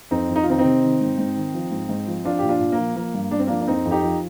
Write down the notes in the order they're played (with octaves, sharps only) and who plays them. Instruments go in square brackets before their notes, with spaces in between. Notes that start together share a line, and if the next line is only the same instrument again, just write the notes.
[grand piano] F2 C4 D#4
F2
D#4
F4
D#3 C4 D#4
C4 D#4
C3
D#3
G#2
G#2
D#3
F3
G#2
G#2
F3
F3 D4 F4
A#2 G4
D4 F4
A#2
A#3
F3
F3 A#3
G2
G2 D4
C4
F3 A#3 D4
D4
F2 C4 D#4
F2
D#4 G4
F3